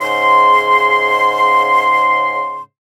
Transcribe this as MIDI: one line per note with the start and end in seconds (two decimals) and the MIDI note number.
0.01 2.61 44
0.01 2.61 49
0.01 2.61 84